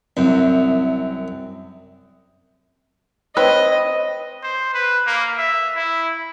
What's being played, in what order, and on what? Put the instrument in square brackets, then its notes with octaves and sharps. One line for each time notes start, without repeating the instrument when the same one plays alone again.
[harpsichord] C2 F#2
[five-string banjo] C4 B4 C#5 [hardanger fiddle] D#5
[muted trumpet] C5
B4
A#3
E5
E4